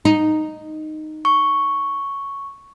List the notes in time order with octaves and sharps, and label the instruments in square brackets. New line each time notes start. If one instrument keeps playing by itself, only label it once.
[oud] D#4
[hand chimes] C#6